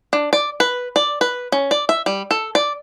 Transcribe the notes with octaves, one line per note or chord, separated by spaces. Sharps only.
D4
D5
B4
D5
B4
C#4
D5
E5
G3
A4
D5